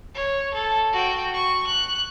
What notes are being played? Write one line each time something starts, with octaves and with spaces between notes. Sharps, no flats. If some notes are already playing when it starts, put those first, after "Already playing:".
C#5
A4
F#4 G5
C#6
F#6